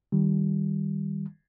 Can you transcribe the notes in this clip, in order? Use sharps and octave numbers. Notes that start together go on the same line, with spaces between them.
D#3 G3